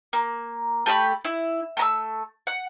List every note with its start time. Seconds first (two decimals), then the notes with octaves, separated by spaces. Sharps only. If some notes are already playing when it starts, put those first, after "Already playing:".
0.13 A#3
0.86 A3 G4 A#5 B5
1.25 E4
1.77 A3 A#5 E6
2.47 F#5